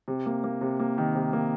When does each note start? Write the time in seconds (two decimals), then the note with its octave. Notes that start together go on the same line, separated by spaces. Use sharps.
0.08 C3
0.26 A#3
0.44 A#3
0.61 C3
0.80 A#3
0.98 D#3
1.15 C3
1.33 A#3